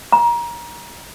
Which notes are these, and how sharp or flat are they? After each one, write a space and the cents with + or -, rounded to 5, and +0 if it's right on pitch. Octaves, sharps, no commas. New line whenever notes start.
A#5 +25